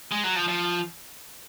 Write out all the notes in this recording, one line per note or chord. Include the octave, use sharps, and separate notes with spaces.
G#3
F#3
F3
F3